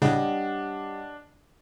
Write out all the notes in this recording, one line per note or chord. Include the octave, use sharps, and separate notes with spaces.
A2 C#3 G3 D4 C#5 D#5 F#5